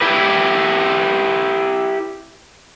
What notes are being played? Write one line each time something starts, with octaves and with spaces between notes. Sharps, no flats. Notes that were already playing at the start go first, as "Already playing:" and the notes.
E4 G4 B4